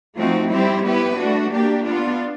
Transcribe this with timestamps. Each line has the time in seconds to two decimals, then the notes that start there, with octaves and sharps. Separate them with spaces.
0.18 F3 A3 C4 D#4 F#4
0.52 G3 C4 E4 G4 C5
0.85 B3 E4 G4 B4
1.19 A3 D4 F#4
1.54 A#3 D4 G4
1.87 B3 D4 F4